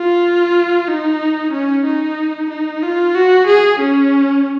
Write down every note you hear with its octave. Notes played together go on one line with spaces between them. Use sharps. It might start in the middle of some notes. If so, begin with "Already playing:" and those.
Already playing: F4
D#4
C#4
D#4
D#4
F4
F#4
G#4
C#4